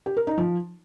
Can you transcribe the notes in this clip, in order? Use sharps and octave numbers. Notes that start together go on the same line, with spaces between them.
G4
A#4
D#4
F3